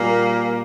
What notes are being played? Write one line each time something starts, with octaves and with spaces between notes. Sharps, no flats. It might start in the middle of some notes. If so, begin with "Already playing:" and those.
Already playing: A#2 G3 A#3